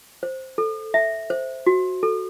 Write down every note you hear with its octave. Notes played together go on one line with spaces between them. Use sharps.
C5
A4
E5
C5
F#4
A4